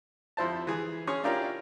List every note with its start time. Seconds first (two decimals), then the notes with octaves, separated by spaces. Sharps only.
0.37 F2 E4 C5 A5
0.67 E3 G#4
1.07 C#4 G#4 C#6
1.23 C#4 D4 E4 F4 G4 A#4